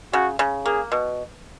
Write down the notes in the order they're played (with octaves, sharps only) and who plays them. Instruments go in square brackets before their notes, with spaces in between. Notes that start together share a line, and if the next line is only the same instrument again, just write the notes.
[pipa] C#3 [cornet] F#4
[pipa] C#3
[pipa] A#3 [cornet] G#4
[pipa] B2